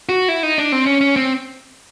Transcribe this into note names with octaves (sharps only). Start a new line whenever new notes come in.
F#4
E4
D#4
D4
C4
C#4
C#4
C4